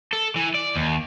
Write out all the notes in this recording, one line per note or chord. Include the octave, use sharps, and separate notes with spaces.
A4
E3
D5
D#2